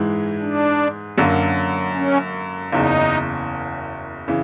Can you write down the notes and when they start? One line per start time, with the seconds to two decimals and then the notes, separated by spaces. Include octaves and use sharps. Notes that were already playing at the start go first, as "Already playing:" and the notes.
Already playing: G#2 E3 G#3
0.41 D4
1.18 F#2 D3 F#3 A#3
1.95 C#4
2.72 F#1 E2 C#3 D#4
4.28 C#3 E3